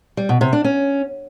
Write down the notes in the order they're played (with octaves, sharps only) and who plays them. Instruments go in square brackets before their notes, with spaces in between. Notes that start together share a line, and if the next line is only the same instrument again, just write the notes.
[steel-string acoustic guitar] G3
B2
C3
D4
C#4